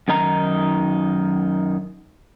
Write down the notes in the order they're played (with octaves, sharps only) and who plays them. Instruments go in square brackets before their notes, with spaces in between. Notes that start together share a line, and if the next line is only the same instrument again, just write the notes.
[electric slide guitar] F#2 D#3 D#4 A#5